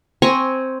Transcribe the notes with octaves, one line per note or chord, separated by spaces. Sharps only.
C4 G#5 A#5 C#6